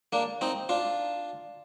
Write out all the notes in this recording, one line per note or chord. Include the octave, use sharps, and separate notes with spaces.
A#3 D4
C4 D#4
D4 F4